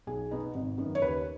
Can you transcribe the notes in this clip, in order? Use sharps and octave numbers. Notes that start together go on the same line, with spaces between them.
B1 G#4
B2 B3 D#4
G#1
F#2 D#3 B3
C#5
D#2 B4